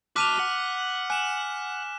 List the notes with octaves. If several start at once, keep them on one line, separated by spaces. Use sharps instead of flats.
F#4 A5 D6 F6 F#6 B6 D#7 F7
F#5
G#5 F#6 E7